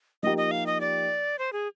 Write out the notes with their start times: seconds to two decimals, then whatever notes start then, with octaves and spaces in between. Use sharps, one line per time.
0.23 F3 A#3 D#4 G4 D#5
0.37 D#5
0.51 F5
0.66 D#5
0.81 D5
1.39 C5
1.53 G#4